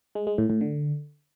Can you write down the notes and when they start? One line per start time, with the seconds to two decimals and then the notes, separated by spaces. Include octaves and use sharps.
0.15 G#3
0.27 G#3
0.38 A2
0.50 A2
0.61 D3